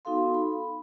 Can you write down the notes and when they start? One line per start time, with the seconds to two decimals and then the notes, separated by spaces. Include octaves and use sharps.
0.05 B3 D#4 F#4 A4 F5 C6
0.34 B5